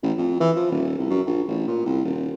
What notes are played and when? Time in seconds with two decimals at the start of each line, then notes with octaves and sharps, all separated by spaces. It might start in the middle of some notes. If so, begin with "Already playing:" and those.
0.03 A1
0.17 F2
0.40 E3
0.56 F3
0.72 D#1
0.99 C2
1.10 F#2
1.27 A#1
1.48 A1
1.68 A#2
1.86 C2
2.05 D#1